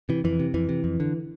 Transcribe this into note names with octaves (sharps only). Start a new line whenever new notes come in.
C3 E3
F2 E3
C3
F2 E3
C3
F2
D3